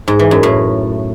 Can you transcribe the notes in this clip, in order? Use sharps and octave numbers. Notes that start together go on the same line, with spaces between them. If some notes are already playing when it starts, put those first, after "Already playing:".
G#2
E3
F#2
A2